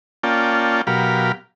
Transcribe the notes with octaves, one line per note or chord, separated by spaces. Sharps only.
A#3 C#4 F4 D5 G5 A5
B2 F#3 G4 A#4 F5 B5